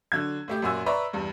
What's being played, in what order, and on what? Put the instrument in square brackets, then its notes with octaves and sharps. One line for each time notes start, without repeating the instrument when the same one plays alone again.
[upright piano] D3 F#3 G#6
A2 A3 G4
F#2 A#2 A#3 F#4 G#5 E6
B4 D5 E5 A#5 C6 C#6
E2 G2